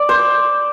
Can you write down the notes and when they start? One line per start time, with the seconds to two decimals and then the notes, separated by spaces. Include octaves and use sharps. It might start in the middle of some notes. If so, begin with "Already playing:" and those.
Already playing: D5
0.09 C5